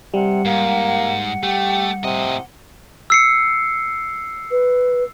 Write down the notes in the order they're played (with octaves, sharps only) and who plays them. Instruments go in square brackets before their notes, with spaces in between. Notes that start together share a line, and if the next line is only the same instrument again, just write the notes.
[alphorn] C3 [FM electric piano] G3 [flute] F#5
[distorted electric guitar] G#2 [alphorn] A#3
[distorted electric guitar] A3 [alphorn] G4
[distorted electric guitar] A2 D#5 [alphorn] C3
[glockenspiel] E6 C7 C#7
[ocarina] B4